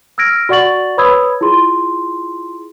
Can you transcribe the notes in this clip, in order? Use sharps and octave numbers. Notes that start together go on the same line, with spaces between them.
E6 F6 G#6 A#6 D7
F#4 D5 F#5 C#6 A6 F#7
B4 C#5 B5 D#6 E6 G#6
E4 F4 G#4 C6